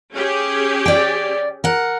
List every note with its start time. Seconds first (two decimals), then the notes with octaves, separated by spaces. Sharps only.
0.12 C#4 G4 G#4
0.86 D5 G5
1.64 A#4 F#5